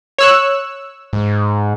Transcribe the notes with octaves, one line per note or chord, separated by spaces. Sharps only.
C#5 E6 F#6
G#2